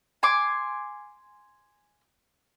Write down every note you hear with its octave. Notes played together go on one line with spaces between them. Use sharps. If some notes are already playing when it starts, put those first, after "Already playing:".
G#5 C6 D6